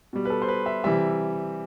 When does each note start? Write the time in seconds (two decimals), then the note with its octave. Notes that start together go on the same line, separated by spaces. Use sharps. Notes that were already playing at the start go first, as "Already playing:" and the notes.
0.13 B2 G3
0.25 B4
0.30 A4
0.42 C5
0.48 B4
0.66 E5
0.84 C3 E3 G3 E5